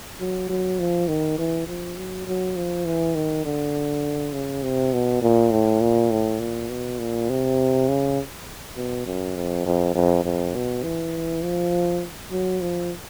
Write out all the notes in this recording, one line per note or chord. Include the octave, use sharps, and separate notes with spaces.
F#3
F#3
F3
D#3
E3
F3
F#3
F#3
F3
E3
D#3
D3
C#3
C3
B2
A#2
A2
A#2
A2
A#2
B2
A#2
C3
C#3
B2
F#2
F2
F2
F2
F2
B2
E3
F3
F#3
F3